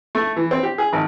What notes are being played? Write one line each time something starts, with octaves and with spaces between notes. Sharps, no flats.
A3
E3
C4
G4
G#4
G#1